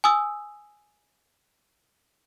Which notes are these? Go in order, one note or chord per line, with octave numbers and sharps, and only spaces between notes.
G#5 D#6 E6